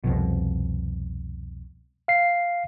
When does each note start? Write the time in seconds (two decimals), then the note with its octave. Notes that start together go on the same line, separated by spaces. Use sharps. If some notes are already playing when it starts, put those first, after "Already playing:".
0.04 C2 F2 B2
2.08 F5 C7